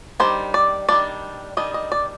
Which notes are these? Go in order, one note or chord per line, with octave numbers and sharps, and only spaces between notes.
D#3 G3 D4 C5
D5
D#3 G3 D4 D5
D#3 G3 D4 D#5
D#5
D5